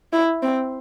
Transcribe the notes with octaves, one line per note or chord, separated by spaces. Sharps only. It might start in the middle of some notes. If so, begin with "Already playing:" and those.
E4
C4